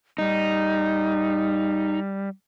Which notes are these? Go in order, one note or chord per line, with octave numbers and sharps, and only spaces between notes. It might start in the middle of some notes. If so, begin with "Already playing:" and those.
G3 D#4